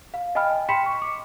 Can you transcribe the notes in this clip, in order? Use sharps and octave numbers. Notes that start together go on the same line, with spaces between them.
F5
D#5 G5 G#5 B5 F6
G5 B5 C6 B6 C#7 E7
C#6
D6